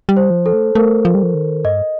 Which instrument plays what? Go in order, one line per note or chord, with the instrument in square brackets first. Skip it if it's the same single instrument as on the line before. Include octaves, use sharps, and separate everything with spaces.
[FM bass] G3
[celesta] C5
[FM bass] F3
[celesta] A4
[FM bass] A3
[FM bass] A3 [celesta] A#4
[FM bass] F3
G3
F3
D#3
[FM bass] G2 [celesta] D#5